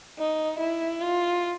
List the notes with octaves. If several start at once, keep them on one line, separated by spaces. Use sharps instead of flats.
D#4
E4
F4